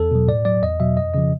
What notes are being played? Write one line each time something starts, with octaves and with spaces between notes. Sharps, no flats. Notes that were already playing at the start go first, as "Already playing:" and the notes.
Already playing: E2 A4
B2 F#3
A2 D5
F#3 D5
E2 D#5
B2 F#3 E5
F2 D#5
C#3 F3 D#5